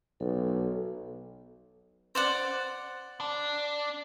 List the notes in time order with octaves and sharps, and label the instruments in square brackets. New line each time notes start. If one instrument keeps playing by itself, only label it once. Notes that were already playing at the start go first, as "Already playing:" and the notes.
[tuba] B1 [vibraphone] A4
[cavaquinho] C5 D5 F#5
[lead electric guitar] D4